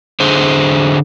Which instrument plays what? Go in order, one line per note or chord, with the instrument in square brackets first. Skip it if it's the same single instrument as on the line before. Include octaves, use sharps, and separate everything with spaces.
[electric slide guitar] D3 G#4 C5